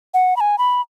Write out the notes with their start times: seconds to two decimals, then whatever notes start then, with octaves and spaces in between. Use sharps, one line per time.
0.14 F#5
0.37 B5
0.40 G#5
0.58 B5